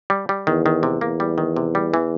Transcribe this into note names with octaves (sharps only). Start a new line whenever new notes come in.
G3
G3
E2 D#3
D#3
C3
E2 A#3
G3
D#3
C3
G3
E3